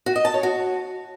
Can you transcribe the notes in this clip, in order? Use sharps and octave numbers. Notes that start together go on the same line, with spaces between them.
F#4
D#5
A5
C#5
F#4